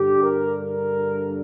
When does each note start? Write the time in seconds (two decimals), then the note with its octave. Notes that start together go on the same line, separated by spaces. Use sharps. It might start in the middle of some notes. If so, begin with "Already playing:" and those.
Already playing: G2 D3 G4
0.23 A#4
0.59 A#4